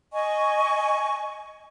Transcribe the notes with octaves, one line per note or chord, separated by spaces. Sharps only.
D#5 G#5 C#6